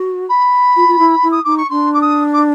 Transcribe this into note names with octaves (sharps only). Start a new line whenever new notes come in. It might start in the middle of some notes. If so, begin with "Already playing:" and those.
Already playing: F#4
B5
F4
F4
E4
E4
D#6
D#4 D6
C#6
D4 C6
D6
D#6
D6